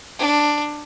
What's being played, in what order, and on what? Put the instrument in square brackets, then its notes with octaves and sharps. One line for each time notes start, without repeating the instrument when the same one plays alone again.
[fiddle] D4